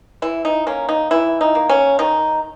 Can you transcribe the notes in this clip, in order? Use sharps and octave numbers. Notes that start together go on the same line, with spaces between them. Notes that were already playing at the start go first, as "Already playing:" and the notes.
E3 E4
D#4
A#3 C#4
D#4
E3 E4
D#4
A#3
C#4
D#3 D#4